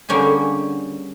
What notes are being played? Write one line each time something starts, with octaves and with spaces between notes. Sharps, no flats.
D3 G3 A#3 C#4 G4 G#4